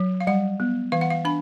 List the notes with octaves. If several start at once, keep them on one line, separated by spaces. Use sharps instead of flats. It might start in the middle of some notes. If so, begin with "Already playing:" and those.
Already playing: F#3
F5
G3 F#5
B3
E3 F5
F#5
F5
D4 B5